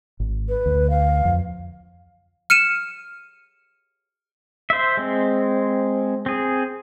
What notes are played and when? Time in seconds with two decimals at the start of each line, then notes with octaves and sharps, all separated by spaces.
0.20 G#1
0.49 B4
0.66 D2
0.90 F5
1.25 F2
2.50 F6 C#7 D#7 E7
4.70 C5 E5
4.97 G#3 C4
6.26 C4 G#4